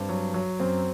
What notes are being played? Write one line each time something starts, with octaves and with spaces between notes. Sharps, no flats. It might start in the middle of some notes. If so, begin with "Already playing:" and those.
Already playing: G2 C4
F#3
F#3
F#2 C4